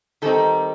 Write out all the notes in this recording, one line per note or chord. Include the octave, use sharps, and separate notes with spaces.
D#3 G3 C4 D#4 A4